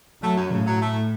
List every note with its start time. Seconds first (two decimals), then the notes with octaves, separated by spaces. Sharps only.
0.22 F#3 A3
0.37 F#2
0.52 A2 C#3
0.66 F#3
0.81 A3